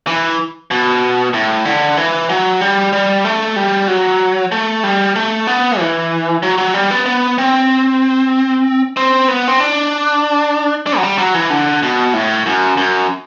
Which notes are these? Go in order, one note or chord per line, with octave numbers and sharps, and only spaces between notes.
E3
B2
A2
D3
E3
F#3
G3
G3
A3
G3
F#3
A3
G3
A3
B3
E3
F#3
F#3
G3
B3
B3
C4
C4
B3
C4
D4
D4
F#3
G3
F#3
E3
D3
B2
A2
F#2
F#2